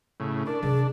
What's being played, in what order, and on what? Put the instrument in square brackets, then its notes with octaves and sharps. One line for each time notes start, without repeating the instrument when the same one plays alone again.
[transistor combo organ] A2 C#3
[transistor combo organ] D4 [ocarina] A#4
[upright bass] C3 [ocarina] G#4